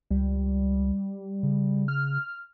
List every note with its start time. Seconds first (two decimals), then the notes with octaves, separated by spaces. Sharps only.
0.10 C#2 G3
1.43 C#3
1.88 F6